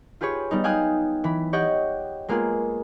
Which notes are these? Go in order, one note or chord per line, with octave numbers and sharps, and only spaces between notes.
F4 G4 G#4 B4 C#5
G3 B3 D#4
F5 G5 G#5 D#6 F#6
E3 B5
G4 C#5 D#5 F#5 G5
G#3 A#3 B3 F4 G#4